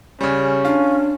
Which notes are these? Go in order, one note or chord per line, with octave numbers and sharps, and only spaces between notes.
C#3 G3 C#4
D4 F4